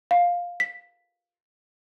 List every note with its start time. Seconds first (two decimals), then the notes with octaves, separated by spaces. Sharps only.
0.11 F5
0.60 B6